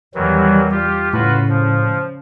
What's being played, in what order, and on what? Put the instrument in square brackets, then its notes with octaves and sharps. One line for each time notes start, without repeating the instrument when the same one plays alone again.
[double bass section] E2 G3 [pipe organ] D#3 E3 F#3
[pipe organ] F4 G4
[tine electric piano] A2 [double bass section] C#3 [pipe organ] F4 F#4 B4
[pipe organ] F3